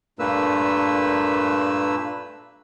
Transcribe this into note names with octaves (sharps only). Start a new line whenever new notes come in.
G2 A#2 A3 A#3 B4 E6